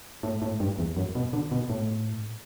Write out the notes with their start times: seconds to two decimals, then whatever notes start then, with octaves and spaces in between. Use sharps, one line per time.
0.23 A2
0.42 A2
0.60 G2
0.79 E2
0.97 F#2
1.15 B2
1.33 D3
1.51 B2
1.70 A2